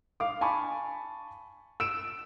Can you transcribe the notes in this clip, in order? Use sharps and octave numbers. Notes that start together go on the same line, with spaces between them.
F5 D6
G#5 A5 B5 C#6
E6 D7 E7